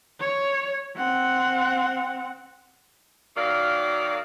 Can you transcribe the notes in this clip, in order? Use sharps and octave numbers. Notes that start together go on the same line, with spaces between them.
C#5
C4 F#5
D#3 F#3 A#3 D5 F5